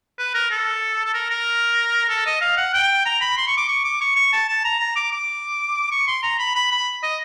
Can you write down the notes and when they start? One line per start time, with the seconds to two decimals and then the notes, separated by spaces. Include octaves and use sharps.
0.18 B4
0.34 A#4
0.51 A4
1.05 A4
1.14 A#4
1.30 A#4
2.09 A4
2.26 D#5
2.41 F5
2.57 F#5
2.74 G5
3.05 A#5
3.21 B5
3.37 C6
3.48 C#6
3.58 D6
3.68 C#6
3.84 D6
4.01 C#6
4.16 C#6
4.33 A5
4.48 A5
4.64 A#5
4.80 A#5
4.96 D6
5.12 D6
5.91 C#6
6.07 C6
6.23 A#5
6.39 B5
6.55 B5
6.72 B5
7.03 D#5